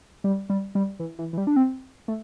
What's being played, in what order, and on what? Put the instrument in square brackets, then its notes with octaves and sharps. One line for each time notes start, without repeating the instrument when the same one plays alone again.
[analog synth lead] G3
G3
G3
E3
E3
E3
G3
D4
C4
A3